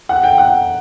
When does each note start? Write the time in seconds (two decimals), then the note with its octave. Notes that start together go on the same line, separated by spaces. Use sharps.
0.09 F#5
0.23 G5
0.38 F#5